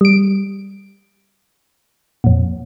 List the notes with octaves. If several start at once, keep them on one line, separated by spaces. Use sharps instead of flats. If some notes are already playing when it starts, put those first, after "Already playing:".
G3 D7
F2 A#2